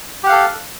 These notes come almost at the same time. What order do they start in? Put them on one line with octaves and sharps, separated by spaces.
G4 F#5 F5 A4